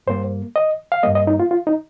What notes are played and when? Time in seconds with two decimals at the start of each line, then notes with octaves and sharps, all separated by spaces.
0.07 G2 G3 A#3 C5
0.56 D#5
0.92 F5
1.03 G2 G3 A#3 D#5
1.15 D#5
1.27 D#4
1.40 F4
1.51 F4
1.67 D#4